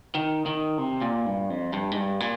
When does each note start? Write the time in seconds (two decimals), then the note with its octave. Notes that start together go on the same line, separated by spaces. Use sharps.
0.15 D#3
0.46 D#3
0.78 C3
1.02 A#2
1.26 G2
1.50 F2
1.73 G2
1.91 G#2
1.97 G2
2.20 A#2